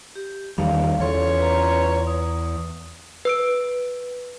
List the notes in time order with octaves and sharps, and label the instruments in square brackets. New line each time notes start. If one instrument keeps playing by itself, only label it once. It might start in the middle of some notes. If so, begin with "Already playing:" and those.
[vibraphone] G4
[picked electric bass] E2 D#3 G3 [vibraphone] F5
[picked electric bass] E2 [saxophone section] C#3 F4 C#5 [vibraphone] A4
[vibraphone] B4 A#5
D#6
[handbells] B4 E6 D7